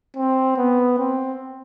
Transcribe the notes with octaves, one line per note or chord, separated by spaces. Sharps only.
C4
B3
C4